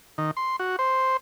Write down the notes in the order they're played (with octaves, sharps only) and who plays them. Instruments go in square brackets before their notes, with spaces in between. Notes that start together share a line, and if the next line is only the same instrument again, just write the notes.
[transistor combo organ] D#3
C6
F#4
C5